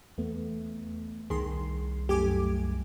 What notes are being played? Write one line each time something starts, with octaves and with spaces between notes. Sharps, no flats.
E2 A3 B3
C2 D#3 G#4 C6
F#2 A3 G4 G#5 D6